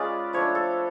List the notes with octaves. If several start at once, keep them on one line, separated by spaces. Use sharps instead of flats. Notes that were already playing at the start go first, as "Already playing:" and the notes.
Already playing: G#3 C#4 F4 B4 D5
F3 A3 D4 C#5
A4